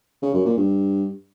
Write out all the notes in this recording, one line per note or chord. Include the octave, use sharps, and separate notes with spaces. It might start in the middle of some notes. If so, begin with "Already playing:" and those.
C#3
F#2
A#2
G2